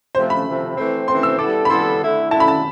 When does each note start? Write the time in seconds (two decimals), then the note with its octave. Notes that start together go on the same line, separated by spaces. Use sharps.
0.15 C3 F3 A3 C5
0.30 B5
0.47 C3 F3 A3
0.77 E3 A3 C4
1.08 E3 A3 C4 C6
1.23 E6
1.39 G3 B3 E4 A4 D6
1.65 B5
1.70 G3 B3 E4 A4 C6
2.01 D3 A3 E4
2.31 D3 A3 E4 A5
2.40 B5
2.48 A5